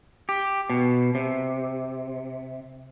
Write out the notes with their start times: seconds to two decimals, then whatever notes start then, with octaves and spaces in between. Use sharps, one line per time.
0.29 G4
0.70 B2
1.15 C3